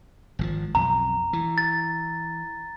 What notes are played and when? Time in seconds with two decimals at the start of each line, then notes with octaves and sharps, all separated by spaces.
0.39 G#1 C#3 F3
0.75 B1 F2 A#5
1.33 E3
1.58 A6